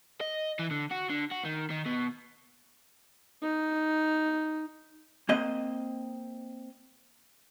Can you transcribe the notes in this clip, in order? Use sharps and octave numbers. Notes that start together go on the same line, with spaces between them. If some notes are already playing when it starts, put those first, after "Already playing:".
D#5
E3
D3
F#4
D3
F#4
D#3
D#3
B2
D#4
A#3 C4 D#5